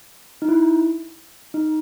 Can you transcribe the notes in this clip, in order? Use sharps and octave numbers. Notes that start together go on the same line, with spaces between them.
D#4
E4
D#4